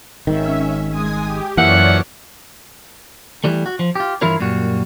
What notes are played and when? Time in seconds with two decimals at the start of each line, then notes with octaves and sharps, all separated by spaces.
0.27 G#1 G#2 D#3 C#4 E5
0.87 G#3 G#5 D#6
1.24 G4
1.57 F#2 E3 F3 A#3 C#5 D5 E5 F#5
3.44 E3 G3 A3
3.66 F#4
3.79 F3
3.96 F4 G4
4.21 G2 E3 E4 F4 A#4 C#5
4.40 F#2 A#2 G3 F#4